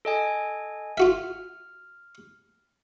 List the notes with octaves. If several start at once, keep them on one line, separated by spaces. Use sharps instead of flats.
A4 D#5 G#5
F4 F#4 E5 F6